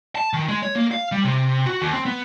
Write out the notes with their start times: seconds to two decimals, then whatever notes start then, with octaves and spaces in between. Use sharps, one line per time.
0.15 A5
0.33 D#3
0.48 G#3
0.62 C#5
0.76 A#3
0.91 F5
1.12 G3
1.24 C3
1.66 F#4
1.82 D#2
1.93 C4
2.06 B3